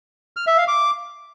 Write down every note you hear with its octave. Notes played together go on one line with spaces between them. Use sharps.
F6
E5
F5
D6